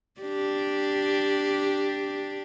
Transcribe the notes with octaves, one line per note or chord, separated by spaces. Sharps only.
D4 G4